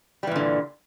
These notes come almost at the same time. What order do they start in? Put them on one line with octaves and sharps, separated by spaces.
G3 E3 A#2 D3